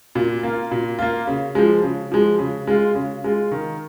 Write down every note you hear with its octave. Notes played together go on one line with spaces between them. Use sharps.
A#2
A#3 F4
A#2
A#3 F4
C#3
F3 G#3
C#3
F3 G#3
C#3
G#3 F4
C#3
G#3 F4
D#3